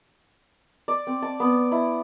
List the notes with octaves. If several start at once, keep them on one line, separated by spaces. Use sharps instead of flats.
D5
C4
A5
B3
E4